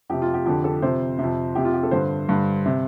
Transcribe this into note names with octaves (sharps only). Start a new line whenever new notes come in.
F2 C3 G4
F4
G4
F2 D3 G4
A4
F2 C3 C5
F2 C3
F2 C3 G4
F4
G4
A4
G2 D3 C5
G2 D3
C3